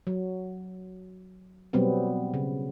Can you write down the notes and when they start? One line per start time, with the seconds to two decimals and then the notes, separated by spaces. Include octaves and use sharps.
0.07 F#3
1.73 B2 F#3 G3 B3 C4
2.34 C#3